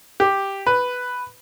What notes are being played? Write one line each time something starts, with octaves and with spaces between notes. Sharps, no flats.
G4
B4